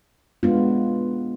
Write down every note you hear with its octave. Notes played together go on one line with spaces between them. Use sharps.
G#3 B3 D4 F4